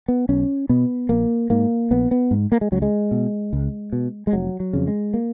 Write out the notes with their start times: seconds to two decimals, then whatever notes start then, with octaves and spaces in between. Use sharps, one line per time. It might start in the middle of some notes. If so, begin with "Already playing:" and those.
0.08 B3
0.29 B1 C#4
0.69 B2 B3
1.09 A#1 A#3
1.50 G#2 A#3
1.91 A#1 B3
2.11 B3
2.31 G#2
2.52 A#3
2.61 G#3
2.72 C#2 F#3
2.82 G#3
3.11 B2
3.53 C#2
3.92 B2
4.27 G#3
4.33 F1 F#3
4.60 F#3
4.73 F2 C#3
4.87 G#3
5.14 A#3